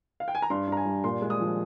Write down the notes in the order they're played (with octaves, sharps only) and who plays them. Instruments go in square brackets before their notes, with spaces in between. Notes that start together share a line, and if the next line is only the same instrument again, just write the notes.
[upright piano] F5
G5
G#5
A#5
G2 C6
G2 A#5
G#5
G3
A#2 C6
G#3
D#6
F3